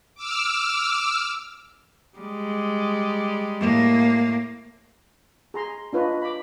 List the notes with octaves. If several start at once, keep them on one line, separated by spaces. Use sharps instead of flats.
D6 E6 F6
G3 G#3
A2 A#3
G#4 A#5 C6
D4 F4 B4 C#5 D#5
B5 D6